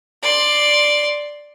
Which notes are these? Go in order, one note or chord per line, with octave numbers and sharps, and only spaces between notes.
D5 C6